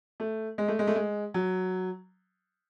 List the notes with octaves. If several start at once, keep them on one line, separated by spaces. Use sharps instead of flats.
A3
G#3
A3
G#3
A3
G#3
F#3